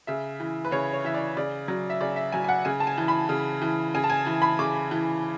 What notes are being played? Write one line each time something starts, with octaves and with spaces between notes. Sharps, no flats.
C#3 E5
E3
B4
C#3 C#5
C#5
E3 E5
D5
C#3 D5
F#3
E5
C#3 D5
E5
F#3 G#5
G#5
F#5
C#3 G#5
A5
G#5
E3
B5
C#3
E3
C#3 G#5
A5
G#5
E3
B5
C#3 D6
E3